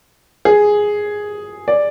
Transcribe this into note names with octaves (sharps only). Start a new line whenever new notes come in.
G#4
D5